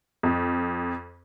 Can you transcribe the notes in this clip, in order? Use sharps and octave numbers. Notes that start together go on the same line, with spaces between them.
F2